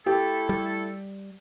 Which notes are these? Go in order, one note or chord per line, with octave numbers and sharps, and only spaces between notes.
A3 E4 G4 A4
G3